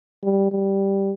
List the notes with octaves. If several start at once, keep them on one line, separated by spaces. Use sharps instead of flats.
G3
G3